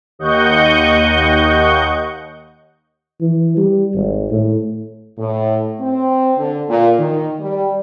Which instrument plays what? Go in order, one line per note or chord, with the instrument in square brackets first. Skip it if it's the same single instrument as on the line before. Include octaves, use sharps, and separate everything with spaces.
[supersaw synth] D#2 D#5 F#5 C#6 G6
[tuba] E3
G3
G#1
A2
[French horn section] A2
C4
D3
A#2
D#3
G3